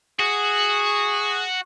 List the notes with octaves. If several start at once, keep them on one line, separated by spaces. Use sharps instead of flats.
F#4 G#4